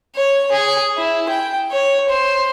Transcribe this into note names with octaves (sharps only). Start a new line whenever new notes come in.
C#5
G#4
E4
G5
C#5
C5